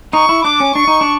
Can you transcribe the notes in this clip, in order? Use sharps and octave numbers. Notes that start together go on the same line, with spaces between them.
D#4 C#6
E4
D4 D6
C#4
D4 C#6
D#4
D4